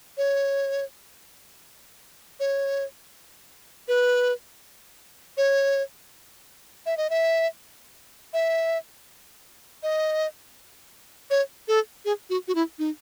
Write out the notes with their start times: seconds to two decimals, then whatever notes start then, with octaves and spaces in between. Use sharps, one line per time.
0.17 C#5
2.40 C#5
3.88 B4
5.37 C#5
6.86 E5
6.97 D#5
7.10 E5
8.33 E5
9.83 D#5
11.30 C#5
11.68 A4
12.05 G#4
12.30 F#4
12.48 F#4
12.55 E4
12.79 D#4